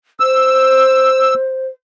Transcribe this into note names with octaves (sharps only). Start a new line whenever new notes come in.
C5 E6